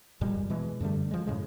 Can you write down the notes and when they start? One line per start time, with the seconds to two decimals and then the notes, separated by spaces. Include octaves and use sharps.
0.21 F2 A#2 G3 G#3
0.50 B2 E3 G#3
0.80 F#2 D3 G3 A3
1.11 F3 G#3
1.26 F#2 A2 C#3 G#3